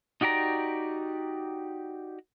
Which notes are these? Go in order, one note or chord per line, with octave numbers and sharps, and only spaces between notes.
D#4 F#4 G4 D5 A#5